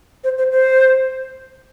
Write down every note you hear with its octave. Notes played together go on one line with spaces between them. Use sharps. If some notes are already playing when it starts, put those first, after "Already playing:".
C5
C5
C5